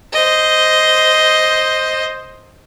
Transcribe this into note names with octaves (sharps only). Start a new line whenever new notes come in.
C5 D#5